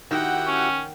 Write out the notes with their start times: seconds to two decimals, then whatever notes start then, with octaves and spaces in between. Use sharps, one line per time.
0.11 D#3 E4 F#4 G4 F#5 G5
0.47 C#4